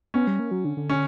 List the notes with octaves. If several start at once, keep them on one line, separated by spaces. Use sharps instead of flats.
B3 C#4
G3
A#3
F#3
D3
D3
C#4